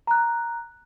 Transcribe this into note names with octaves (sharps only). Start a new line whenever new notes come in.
A#5 F#6